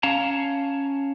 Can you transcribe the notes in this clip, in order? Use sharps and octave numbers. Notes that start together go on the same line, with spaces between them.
C#4 C#5 F5 A5 A#5